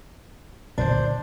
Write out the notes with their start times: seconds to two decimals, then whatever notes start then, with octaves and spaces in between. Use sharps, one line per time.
0.78 A#2 D3 D4 C5